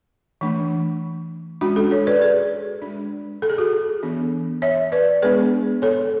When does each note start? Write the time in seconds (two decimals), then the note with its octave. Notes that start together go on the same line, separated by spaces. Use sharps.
0.41 E3 A3 D4
1.61 G#3 C#4 D4 F#4
1.76 F#4 A4
1.91 A4 C#5
2.07 B4 D5
2.21 G#4 B4
2.82 D4
2.87 G#3
3.42 A4
3.50 G#4
3.58 F#4 A4
4.03 E3 B3 D4
4.62 C#5 E5
4.92 B4 D5
5.22 G#3 B3 D4 G#4 B4
5.82 A4 C#5